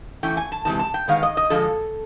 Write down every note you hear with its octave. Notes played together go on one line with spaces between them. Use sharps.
E3 A3 C#4 E4 G5
G#5
A5
E2 C3 E3 G#3 A5
A5
G5
D#3 G#3 B3 F5
D#5
D#5
D3 F3 G#3 A4